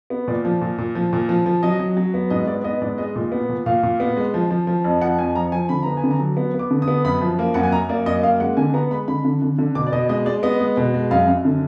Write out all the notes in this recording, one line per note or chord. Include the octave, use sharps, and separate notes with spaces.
B3
A#2 D5
F3
A#2
A#2
F3
A#2
F3
F3
F#3 D#5
F#3
F#3
B3
G#2 D#5
B3 D5
B3 D#5
G#2 D5
G#3 D#5
A#2
B3
A#2
A#2 F5
A#2
B3
G#3
F3
F3
F3
F2
F3 F#5
F2 G#5
F3 A#5
F3 G#5
D3 B5
B3 A#5
G#5
D3
A#5
F#3
B3
B3
D6
D3
D#6
B3
F#2 B5
F3
A#3
F#2 F#5
G#5
F#2 A#5
A#3 D5
F#2 D#5
A#3 F5
G#3 F#5
D3 G#5
B3 A#5
G#3 B5
D3 B5
D3
D3
D3
B2 D6
D5
B2 D#5
G#3 D#5
G#3 D5
B3 D#5
G#3
B2
G#3
F#2 F5
F#2
D3